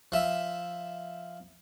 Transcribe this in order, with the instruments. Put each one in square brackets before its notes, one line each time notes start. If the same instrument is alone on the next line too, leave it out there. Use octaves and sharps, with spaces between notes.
[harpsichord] F3 E5